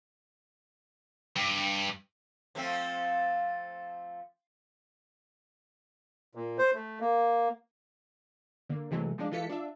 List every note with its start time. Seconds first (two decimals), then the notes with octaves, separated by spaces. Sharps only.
1.36 G2
2.55 F3 A3 C4
6.35 A#2
6.58 C5
6.74 A3
7.00 A#3
8.69 D3 A#3
8.91 C3 E3 F#3 G#3 A3
9.18 F3 G#3 D4
9.32 E3 G#3 F4 A4 B6 C#7
9.49 D4 F4 E5